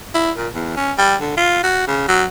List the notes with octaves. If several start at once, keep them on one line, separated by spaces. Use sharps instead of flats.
E4
A#2
E2
C#4
G3
D3
F4
F#4
C#3
F#3